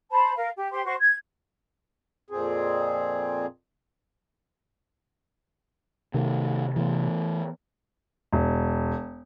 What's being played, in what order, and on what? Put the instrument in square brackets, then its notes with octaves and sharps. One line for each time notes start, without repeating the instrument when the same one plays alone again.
[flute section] C5 A5 B5
A#4 F5
G4
G4 C5 C6
F#4 C5 C#6
G#6
[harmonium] F2 A#2 C4 G#4
[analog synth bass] C3 [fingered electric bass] D#3 A3
[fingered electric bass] E3 A3 B3
[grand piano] E1